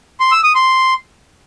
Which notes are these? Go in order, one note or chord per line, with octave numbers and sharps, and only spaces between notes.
C6
E6
D#6
C6